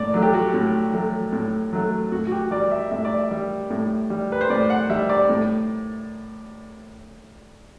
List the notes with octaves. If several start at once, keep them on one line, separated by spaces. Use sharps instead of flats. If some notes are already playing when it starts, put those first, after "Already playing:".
Already playing: A2 D5
F#3 A3
G4
F#4
A2
F#3 A3
A2
F#3 A3
A2 F#4
F#4
G4
G3 D5
E5
A2 E5
D5
E5
G3
A2
G3
B4
C5
A2 D5
F#5
G3 E5
D5
A2